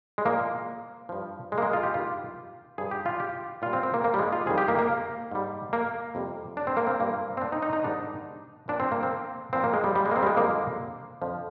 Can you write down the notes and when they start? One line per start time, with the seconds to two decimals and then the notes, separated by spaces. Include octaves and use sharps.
0.18 G#3
0.25 A#2 F3 A#3
1.09 G2 F3
1.52 G#3
1.58 A#3
1.62 G#3
1.73 F4
1.83 G4
1.94 G2 D#3 G3 F4
2.78 G2 F3 G#4
2.91 G4
3.06 F4
3.20 G4
3.62 A#2 G3 F4
3.73 C4
3.83 C4
3.94 A#3
4.04 A#3
4.14 G3
4.19 G#3
4.33 F4
4.46 F2 D#3 G3 G#4
4.58 G4
4.68 A#3
4.79 A#3
5.31 G#2 G3
5.73 A#3
6.15 F2 C3 G3
6.57 D4
6.67 C4
6.77 A#3
6.87 C4
7.00 G2 F3 A#3
7.37 C4
7.41 D4
7.52 D#4
7.62 D#4
7.73 D#4
7.84 G#2 D#3 G3 D4
8.68 A#2 F3 D4
8.80 C4
8.91 A#3
9.03 C4
9.53 A#2 F3 C4
9.64 A#3
9.73 G#3
9.84 G3
9.95 G3
10.06 G#3
10.11 A#3
10.16 C4
10.22 G3
10.27 G#3
10.37 F2 D3 G3 A#3
11.22 F2 D3 F3